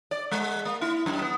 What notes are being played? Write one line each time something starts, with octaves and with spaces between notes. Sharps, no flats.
D5
G#3
A#3
E4
F#2
B3